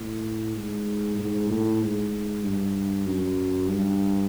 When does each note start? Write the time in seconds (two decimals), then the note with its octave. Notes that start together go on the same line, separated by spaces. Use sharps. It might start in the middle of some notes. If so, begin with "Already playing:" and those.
Already playing: A2
0.56 G#2
1.18 G#2
1.50 A2
1.81 G#2
2.44 G2
3.07 F#2
3.68 G2